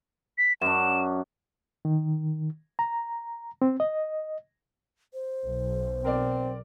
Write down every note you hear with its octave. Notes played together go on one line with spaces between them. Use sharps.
B6
F#2 D4 E7
D#3
A#5
C4
D#5
C5
B1
C4 A#4 D5